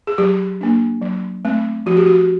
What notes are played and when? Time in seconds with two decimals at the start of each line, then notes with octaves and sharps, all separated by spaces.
0.07 G#4
0.18 F#3 G4
0.61 A#3 D4
1.02 F#3
1.45 A3 C4
1.86 F3 F#4
1.97 G4
2.06 F#4